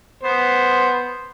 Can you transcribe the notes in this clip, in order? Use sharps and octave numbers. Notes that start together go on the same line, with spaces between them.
B3 C5